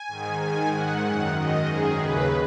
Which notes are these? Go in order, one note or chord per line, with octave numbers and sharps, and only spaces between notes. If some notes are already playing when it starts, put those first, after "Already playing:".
Already playing: G#5
G#2 D#3
G#2 D#3 G#5
G#2 D#3 F#5
F#2 D#3
G#2 D#3 D#5
F#2 D#3 G#4
D#2 C#3 B4